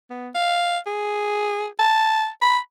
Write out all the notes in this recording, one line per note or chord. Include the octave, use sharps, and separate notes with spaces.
B3
F5
G#4
A5
B5